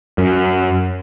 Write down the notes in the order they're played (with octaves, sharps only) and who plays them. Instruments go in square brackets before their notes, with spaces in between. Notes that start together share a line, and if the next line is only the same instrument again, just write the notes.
[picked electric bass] F#2